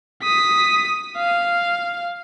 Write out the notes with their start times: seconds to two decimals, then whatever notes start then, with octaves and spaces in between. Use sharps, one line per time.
0.23 D#6 B6
1.17 F5